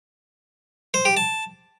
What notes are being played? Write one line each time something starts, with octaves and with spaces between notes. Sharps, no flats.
C5
G4
A5